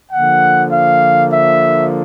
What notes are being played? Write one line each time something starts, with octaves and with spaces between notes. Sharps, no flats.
D3 F3 A#3 F#5
F5
E5